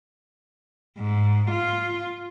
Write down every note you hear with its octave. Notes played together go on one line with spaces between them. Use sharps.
G#2
F4